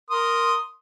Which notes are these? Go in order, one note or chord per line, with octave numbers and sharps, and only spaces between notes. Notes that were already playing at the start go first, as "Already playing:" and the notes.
A#4 C6 D#6